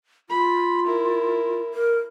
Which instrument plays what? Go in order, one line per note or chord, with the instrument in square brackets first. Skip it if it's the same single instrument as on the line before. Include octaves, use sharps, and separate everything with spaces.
[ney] F4 [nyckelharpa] B5
[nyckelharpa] E4 A#4
[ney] A#4